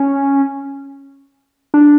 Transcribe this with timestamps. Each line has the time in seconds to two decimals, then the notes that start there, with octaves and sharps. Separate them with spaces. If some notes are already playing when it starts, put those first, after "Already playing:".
Already playing: C#4
1.74 D4